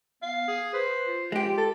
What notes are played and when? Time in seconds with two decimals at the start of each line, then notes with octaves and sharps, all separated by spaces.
0.23 B3 F5
0.48 G#4
0.74 B4 C5
1.07 F4
1.32 G#3 G4
1.58 A4